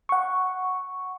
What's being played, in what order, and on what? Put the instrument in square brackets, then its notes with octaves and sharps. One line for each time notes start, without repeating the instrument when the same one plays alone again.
[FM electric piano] F#5 C#6